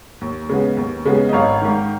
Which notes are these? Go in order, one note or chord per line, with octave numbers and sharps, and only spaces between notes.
D#2
C#3 G#3 B3
D#2
C#3 G#3 B3
D#5
G#1 C#5 F5
G#2 D#3